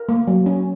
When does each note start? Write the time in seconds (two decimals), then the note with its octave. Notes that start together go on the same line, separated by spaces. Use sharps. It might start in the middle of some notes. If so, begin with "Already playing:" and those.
Already playing: A#4
0.09 A#3
0.27 F#3
0.46 C#4